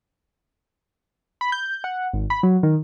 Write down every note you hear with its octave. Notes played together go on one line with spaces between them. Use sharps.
B5
G6
F#5
G#1
B5
F#3
D#3